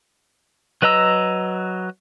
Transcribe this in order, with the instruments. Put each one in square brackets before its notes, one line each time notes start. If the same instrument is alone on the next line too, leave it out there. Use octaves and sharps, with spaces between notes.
[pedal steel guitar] F#3 B4 D#5 A#5 E6